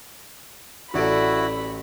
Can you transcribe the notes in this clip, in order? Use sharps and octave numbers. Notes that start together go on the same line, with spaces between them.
A1 F#3 E4 F#4 A4 D5 B5